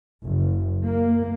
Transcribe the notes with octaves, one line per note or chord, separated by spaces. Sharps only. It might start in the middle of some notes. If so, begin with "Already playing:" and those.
F#1
A#3